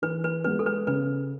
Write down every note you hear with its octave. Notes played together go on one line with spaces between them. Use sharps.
E3 B4
B4
G#3 B3 B4
A4
B4
C#3 B4